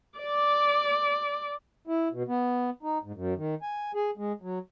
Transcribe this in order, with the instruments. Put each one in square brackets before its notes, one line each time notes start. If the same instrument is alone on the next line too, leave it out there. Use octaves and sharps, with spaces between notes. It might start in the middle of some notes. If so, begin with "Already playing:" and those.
[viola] D5 D6
[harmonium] E4
B2
B3
D#4
G#2
F#2
D#3
G#5
G#4
G#3
F#3